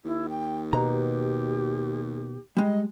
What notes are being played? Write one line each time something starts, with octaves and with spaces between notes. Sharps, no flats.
D#2 E4
G5
B2 G4 A#5
G3 G#3 D#5